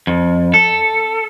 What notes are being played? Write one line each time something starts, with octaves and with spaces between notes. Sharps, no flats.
F2
A4